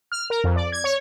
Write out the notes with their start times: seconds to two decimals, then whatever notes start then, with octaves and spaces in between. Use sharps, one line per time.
0.12 F6
0.30 A#4
0.44 F2
0.56 D5
0.72 G#6
0.84 C#5